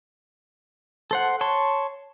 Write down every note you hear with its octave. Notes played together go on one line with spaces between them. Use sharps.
A4 C5 F#5
C#5 A5 C6